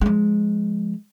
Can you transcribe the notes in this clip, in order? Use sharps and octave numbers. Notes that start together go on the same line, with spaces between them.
F3 G#3